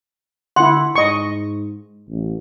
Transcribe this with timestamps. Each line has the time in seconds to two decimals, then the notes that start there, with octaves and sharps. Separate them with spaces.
0.56 D3 E4 F#5 C6
0.96 G#2 D#5 C#6
2.09 A1